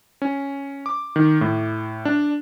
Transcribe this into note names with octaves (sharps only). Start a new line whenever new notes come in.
C#4
D6
D#3
A2
D4